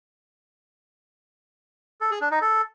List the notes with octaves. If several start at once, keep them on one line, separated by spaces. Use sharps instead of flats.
A4
G#4
D4
D#4
A4